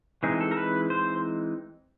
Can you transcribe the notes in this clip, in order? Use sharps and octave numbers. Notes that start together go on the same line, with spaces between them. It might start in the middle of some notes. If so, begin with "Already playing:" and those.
E3 G#3 C4 D#4 G#4
A4
A#4
B4
C5